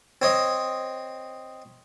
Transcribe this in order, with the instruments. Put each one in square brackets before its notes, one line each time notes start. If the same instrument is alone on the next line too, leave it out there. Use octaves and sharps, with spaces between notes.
[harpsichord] C4 C#5 D#5